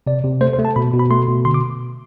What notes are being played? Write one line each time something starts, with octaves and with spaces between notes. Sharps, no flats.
C3 D5
C3
A3 C5
C5
A3
A5
B2 B5
B2
B5
A3 C6
B2
D3 C6
D6